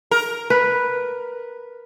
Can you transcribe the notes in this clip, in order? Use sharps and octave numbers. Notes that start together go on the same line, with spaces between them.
A#4
B4